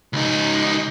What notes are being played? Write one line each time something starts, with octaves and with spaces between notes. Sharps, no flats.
C#2 D#4